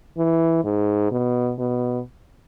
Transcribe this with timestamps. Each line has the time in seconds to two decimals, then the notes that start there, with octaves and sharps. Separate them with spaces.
0.18 E3
0.64 G#2
1.11 B2
1.58 B2